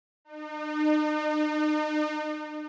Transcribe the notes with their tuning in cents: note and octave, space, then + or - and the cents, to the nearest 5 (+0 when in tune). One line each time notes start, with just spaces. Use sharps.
D#4 -40